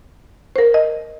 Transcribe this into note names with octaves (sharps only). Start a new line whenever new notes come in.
A#4 C5
D#5